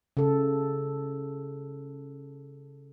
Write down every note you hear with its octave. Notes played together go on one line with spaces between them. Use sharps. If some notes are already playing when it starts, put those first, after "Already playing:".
C#3 A4